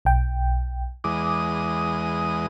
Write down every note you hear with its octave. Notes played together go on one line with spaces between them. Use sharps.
B1 G5
E2 G#3 D6 D#6